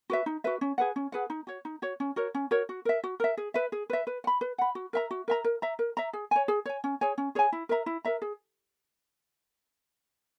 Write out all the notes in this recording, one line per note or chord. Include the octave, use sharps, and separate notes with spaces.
F#4 B4 E5
D#4
F#4 B4 E5
C#4
G#4 B4 F#5
C#4
G#4 B4 F#5
D#4
F#4 C#5
D#4
F#4 C#5
C#4
F#4 A#4 C#5
C#4
F#4 A#4 C#5
F#4
A#4 E5
F#4
A#4 E5
G#4
B4 E5
G#4
B4 E5
B4
F#5
B5
B4
F#5 B5
F#4
A#4 E5 A#5
F#4
A#4 E5 A#5
A#4
E5 A#5
A#4
E5 A#5
G#4
C#5 G#5
G#4
C#5 G#5
C#4
G#4 C#5 G#5
C#4
G#4 C#5 G#5
E4
A#4 E5 A#5
E4
A#4 E5 A#5
G#4